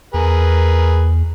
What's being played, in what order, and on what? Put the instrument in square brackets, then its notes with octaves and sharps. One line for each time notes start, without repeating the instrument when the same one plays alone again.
[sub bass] E2 [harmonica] G#4 A#4 B4